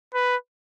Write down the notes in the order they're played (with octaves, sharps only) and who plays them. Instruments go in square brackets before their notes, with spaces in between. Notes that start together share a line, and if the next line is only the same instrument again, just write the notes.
[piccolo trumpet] B4